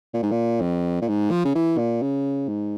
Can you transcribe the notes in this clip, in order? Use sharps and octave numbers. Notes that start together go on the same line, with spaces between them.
A#2
G#2
A#2
F2
A#2
G#2
F3
C#3
E3
A#2
C#3
G#2